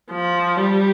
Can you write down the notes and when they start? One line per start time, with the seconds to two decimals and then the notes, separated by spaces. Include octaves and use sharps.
0.11 F3
0.57 G3